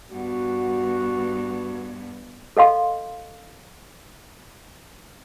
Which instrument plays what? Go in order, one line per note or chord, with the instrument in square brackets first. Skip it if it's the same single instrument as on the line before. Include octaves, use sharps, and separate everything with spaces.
[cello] G2 B3 [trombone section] F#4
[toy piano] A4 D#5 F5 C6